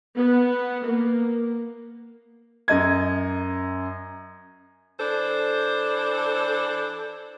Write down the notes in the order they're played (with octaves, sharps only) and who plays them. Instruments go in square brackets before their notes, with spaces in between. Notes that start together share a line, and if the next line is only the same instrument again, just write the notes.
[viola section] B3
A#3
[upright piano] F#2 D#5 G#6
[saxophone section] E3 D4 A4 C5